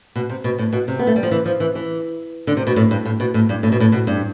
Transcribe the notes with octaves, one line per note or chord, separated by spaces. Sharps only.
B2
C3
B2
A2
B2
C3
B3
A3
G3
F3
E3
F3
E3
E3
D3
C3
B2
A2
G2
A2
B2
A2
G2
A2
B2
A2
B2
G2